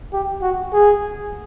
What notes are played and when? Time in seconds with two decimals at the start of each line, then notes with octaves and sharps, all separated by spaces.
0.13 G4
0.42 F#4
0.73 G#4